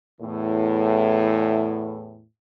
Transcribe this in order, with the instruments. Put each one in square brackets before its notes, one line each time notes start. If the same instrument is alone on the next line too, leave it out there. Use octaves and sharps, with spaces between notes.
[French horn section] E2 A2